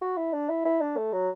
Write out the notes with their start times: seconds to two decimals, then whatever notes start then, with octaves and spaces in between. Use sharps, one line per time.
0.01 F#4
0.17 E4
0.33 D4
0.49 E4
0.65 E4
0.81 D4
0.97 A3
1.13 F#3